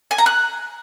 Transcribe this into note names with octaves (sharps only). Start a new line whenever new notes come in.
G#5
A#5
F#6